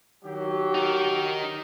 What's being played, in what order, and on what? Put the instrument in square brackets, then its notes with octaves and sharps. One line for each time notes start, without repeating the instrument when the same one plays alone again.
[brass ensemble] D#3 F#3 G4
[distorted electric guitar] D#4 A#4